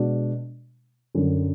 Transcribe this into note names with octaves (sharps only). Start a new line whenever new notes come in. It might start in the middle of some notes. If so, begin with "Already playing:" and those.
Already playing: B2 G#3 D4 F#4
F#2 D3 F#3 C#4